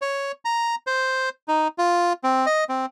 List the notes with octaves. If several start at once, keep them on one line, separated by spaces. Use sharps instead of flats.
C#5
A#5
C5
D#4
F4
C4
D#5
C4